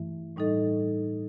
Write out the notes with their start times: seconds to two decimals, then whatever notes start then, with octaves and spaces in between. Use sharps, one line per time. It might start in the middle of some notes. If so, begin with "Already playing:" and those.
Already playing: G2 E3 A3 E4
0.36 A2 G3 D#4 A4 D#5